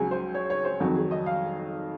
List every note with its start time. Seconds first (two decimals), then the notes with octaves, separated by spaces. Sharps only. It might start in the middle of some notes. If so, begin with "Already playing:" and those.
Already playing: C#2 C#3 F#3 G#5
0.11 C5
0.34 C#5
0.50 C#5
0.65 C5
0.80 F2 D#3 F#3
0.95 G#4
1.11 D#5
1.26 F5